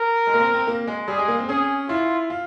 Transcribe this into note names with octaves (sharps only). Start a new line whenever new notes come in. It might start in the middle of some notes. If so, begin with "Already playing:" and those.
Already playing: A#4
G#3
A#3
C4
C4
A#3
G#3
G3 G#4
G#3
A#3
C4
C#4 G#4
E4 F4
F4